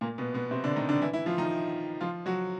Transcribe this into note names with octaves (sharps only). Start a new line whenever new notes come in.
A#2 A#3
B2 B3
B2 B3
C3 C4
D3 D4
D#3 D#4
D3 D4
E3 E4
E3 E4
F3 F4
D#3 D#4
F3 F4
F#3 F#4